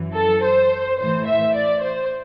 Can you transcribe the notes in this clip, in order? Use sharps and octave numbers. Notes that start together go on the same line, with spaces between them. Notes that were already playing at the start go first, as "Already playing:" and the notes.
Already playing: F#2 E3
A4
C5
A2 E3 C5
E5
D5
C5